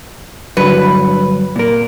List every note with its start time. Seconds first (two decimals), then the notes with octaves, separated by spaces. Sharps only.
0.57 G2 D3 F#3 B4
1.56 A#2 A#4